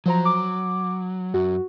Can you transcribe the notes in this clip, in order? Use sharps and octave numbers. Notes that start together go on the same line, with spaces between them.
F3 F#3 C5 A#5
D6
F#2 F#4